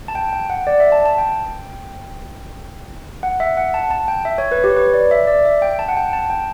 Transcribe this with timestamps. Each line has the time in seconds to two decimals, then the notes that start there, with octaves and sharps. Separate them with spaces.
0.08 A5
0.15 G5
0.33 G5
0.50 F#5
0.67 D5
0.80 E5
0.92 A5
1.06 A5
1.18 G5
3.23 F#5
3.40 E5
3.57 F#5
3.74 A5
3.91 A5
4.08 G5
4.25 E5
4.38 C#5
4.52 B4
4.64 G4
4.71 C#5
4.76 B4
4.94 D5
5.11 E5
5.27 D5
5.45 E5
5.62 G5
5.79 A5
5.88 F#5
5.97 G5
6.13 A5
6.30 G5